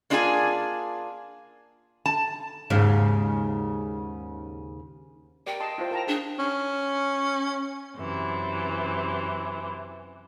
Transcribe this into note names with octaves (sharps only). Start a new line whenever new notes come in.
A#3 D4 F4 G#4 A4 G#5
A5
D#2 G#2 C#3
G4 A#4 D5 G5
D#5 A5 C6
E4 F4 C5
A#4 A5 A#5
D4 G#4
C#4
F#2 C3 E3